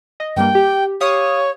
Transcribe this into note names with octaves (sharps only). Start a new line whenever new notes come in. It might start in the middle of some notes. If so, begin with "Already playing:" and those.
D#5
G2 G3 A#3 G5
G4
G4 C#5 F5 D#6